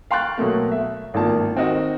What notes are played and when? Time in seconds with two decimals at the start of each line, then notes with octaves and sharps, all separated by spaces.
0.11 F5 G5 C6 C#6 F#6 A6
0.38 B2 F#3 A3 A#3
0.72 E5
1.14 G#1 A2 D#3 A#3 F4 A5
1.56 D#3 C4 D#4 F#4 D#5